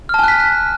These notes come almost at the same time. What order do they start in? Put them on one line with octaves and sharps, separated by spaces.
F6 A5 G#5 F#6 B6